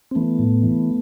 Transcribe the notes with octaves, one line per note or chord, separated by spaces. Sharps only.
C4
E3 A3 B3
A2
E3